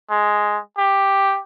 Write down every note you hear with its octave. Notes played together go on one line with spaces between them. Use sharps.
G#3
G4